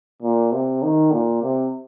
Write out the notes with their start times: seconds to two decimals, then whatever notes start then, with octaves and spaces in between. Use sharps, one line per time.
0.22 A#2
0.52 C3
0.83 D#3
1.12 A#2
1.42 C3